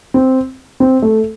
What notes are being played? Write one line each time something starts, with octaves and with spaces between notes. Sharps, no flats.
C4
C4
A3